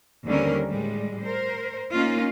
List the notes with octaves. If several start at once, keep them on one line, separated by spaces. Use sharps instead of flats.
D#2 D3 G3 C4 C#4 A#4
A2 G3 G#3
A#4 C5
A#3 C#4 D#4 F4